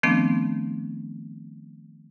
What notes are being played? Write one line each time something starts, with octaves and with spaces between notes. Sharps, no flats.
D#3 F3 A3 B3 C4 D4